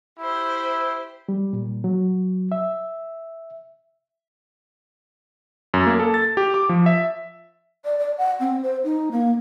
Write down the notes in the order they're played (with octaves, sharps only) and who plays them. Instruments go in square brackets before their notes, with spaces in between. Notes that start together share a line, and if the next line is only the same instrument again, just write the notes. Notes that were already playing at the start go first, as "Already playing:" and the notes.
[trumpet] E4 [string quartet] G4 C5
[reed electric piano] G3
A#2
F#3
E5
[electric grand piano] F#2
A#3
A4
A6
G4
D6
F3
E5
[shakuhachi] D5
D5
F#5
C4
C5
D#4
A#3